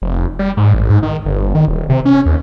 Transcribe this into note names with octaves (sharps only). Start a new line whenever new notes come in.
F1
G3
G#2
A1
G#2
D#3
G1
D#3
D#1
C3
C#4
D#2